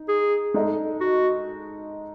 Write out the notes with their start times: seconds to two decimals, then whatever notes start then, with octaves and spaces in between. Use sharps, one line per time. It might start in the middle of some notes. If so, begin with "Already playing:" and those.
Already playing: D#4
0.08 G#4
0.54 G#3 D#4 A4 D#5
1.00 F#4